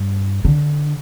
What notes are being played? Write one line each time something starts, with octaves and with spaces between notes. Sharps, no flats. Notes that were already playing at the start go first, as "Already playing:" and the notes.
Already playing: G2
D3